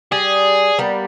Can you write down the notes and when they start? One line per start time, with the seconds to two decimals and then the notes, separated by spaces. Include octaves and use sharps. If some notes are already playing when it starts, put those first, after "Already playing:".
0.12 G3 G#4
0.79 G3 A#3 B3